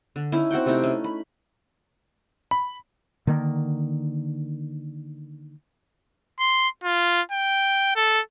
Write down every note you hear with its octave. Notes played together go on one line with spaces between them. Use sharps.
D3
C#4 D#4 E4
C4 F#4 F#5 G5
C3 A3 D#4 E4
C#4
B5
B5
D3 D#3 A#3
C6
F4
G5
A4